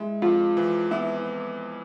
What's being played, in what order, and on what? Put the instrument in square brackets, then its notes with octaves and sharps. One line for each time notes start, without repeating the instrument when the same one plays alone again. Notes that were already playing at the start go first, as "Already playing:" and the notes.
Already playing: [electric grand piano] G#3 [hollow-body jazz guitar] E4
[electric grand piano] F2 [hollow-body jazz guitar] F4
[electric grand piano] E3
[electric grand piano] B3 [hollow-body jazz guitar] E4